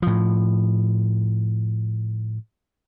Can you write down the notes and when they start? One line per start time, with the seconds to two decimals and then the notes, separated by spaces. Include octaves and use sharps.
0.02 A2 F3